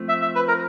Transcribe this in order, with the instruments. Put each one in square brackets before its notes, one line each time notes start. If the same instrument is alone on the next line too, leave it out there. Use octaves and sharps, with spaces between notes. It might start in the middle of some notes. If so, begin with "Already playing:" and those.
Already playing: [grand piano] F3 A3 C4
[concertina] E5
E5
B4
A#4